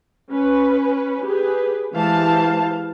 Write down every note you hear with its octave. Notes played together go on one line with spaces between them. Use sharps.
C#4 B4
G4 G#4 B4
E3 G#3 G4 C5 F5 A5